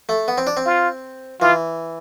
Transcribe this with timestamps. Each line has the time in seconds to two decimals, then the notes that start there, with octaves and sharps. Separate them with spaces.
0.09 A3
0.28 B3
0.38 C4
0.47 D4
0.57 C4
0.66 F4
1.41 E3 F4